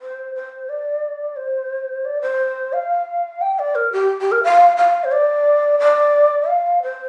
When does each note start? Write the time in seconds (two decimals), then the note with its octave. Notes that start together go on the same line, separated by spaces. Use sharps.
0.01 C5
0.35 C5
0.69 D5
1.36 C5
2.05 D5
2.22 C5
2.73 F5
3.41 G5
3.59 D5
3.75 A#4
3.92 G4
4.21 G4
4.32 A#4
4.44 F5
4.77 F5
5.04 C5
5.12 D5
5.80 D5
6.49 F5
6.83 C5